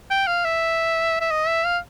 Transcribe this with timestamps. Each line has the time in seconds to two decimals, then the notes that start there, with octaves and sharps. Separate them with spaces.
0.10 G5
0.27 F5
0.45 E5
1.20 E5
1.31 D#5
1.47 E5
1.64 F5